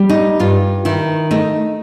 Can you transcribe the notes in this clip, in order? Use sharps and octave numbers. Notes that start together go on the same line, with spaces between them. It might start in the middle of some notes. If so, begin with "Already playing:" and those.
Already playing: G3
D#4
G2 F4
D#3 E4
A3 D#4